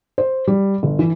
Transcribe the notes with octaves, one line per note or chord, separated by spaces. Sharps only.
C5
G3
G1
E3